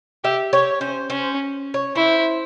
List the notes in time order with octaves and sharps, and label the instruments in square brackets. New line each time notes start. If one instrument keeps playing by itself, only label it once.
[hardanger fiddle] G4 [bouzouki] E5
[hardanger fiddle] G4 [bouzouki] C#5
[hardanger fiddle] C#4 [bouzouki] C5
[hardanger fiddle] C#4 [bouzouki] C5
[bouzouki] C#5
[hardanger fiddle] E4 [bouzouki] C5